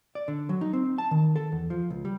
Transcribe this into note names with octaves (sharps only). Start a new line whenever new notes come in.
D5
D3
F#3
D#4
C4
A5
D#3
A4
E2
F3
C#2
G3